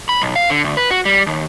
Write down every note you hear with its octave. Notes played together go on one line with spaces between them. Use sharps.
B5
B1
F5
D3
D2
B4
F#4
G3
D#2